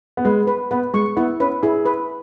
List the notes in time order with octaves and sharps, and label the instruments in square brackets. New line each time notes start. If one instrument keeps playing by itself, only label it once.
[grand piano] B3
[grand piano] G#3 [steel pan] B4
[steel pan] B4
[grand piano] B3 [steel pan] B4
[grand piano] G#3 [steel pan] C#6
[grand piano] B3 [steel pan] E4
[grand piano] C#4 [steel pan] B4
[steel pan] E4 [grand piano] G#4
[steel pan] B4